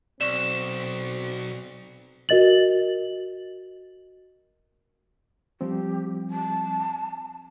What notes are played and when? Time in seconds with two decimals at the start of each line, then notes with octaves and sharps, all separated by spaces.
0.21 B1 C4 D5 C#6 E7
2.29 F#4 A#4 D#5 A6 F#7
5.61 F3 G3 C4 G4
6.30 A5